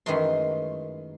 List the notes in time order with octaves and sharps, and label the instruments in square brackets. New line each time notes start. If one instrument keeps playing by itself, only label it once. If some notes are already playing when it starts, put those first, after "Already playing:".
[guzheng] F#2 D#3 E3 G#3 A3 C6